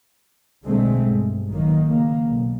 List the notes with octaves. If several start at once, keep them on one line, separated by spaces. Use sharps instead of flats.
B1 D3 G#3 A3 C4
G2
A1 D#3 F#3 A#3
C#3 A#3
B1